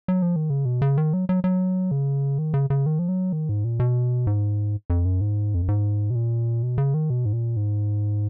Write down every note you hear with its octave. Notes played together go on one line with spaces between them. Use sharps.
F#3
F3
D#3
C#3
B2
C#3
D#3
F#3
F#3
F#3
C#3
D#3
C#3
C#3
D#3
F3
F#3
D#3
G#2
A#2
B2
G#2
F2
F#2
G#2
F2
F#2
G#2
B2
A#2
B2
C#3
D#3
B2
G#2
A#2
G#2